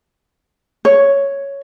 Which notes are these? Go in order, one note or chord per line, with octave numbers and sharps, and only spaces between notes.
C#5